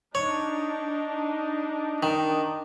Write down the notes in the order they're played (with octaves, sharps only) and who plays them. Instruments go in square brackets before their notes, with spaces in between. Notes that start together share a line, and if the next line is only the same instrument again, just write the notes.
[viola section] D4 D#4 [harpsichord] C#5
[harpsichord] D#3